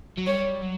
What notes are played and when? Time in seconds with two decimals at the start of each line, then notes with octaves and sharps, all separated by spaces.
0.17 F#3
0.26 G3 C#5
0.62 F#3